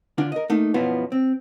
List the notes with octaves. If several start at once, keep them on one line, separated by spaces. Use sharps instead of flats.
D3 D4 F4
A#4 D#5
A3 A#3 D#4
F#2 B2 F3 B3 E4 F4
C4